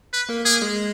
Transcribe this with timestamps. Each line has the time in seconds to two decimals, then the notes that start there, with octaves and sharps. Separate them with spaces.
0.13 B4
0.29 A#3 A#4
0.45 A#3 G#4 A#4
0.62 G#3 G#4